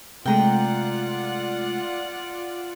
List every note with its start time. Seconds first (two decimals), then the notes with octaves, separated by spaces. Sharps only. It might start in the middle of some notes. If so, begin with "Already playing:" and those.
0.26 C3 G#3 A3 F4 D5 F#5 G5 A#5